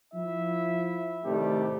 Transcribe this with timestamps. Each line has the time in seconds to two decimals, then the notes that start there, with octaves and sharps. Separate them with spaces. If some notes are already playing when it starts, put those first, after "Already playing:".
0.14 F3 E4 E5
1.24 A2 C3 D#3 G3 A3 G4